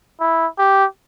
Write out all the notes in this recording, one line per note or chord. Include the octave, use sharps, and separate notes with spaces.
E4
G4